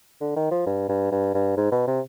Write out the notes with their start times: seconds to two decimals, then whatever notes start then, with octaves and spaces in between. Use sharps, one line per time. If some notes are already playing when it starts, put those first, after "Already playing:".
0.21 D3
0.36 D#3
0.51 F3
0.66 G2
0.89 G2
1.11 G2
1.34 G2
1.57 G#2
1.72 B2
1.87 C3